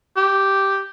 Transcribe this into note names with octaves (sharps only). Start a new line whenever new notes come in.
G4